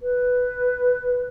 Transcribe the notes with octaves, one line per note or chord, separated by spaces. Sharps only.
B4